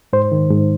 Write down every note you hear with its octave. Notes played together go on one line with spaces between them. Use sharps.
G#2 C5
D#3
G#2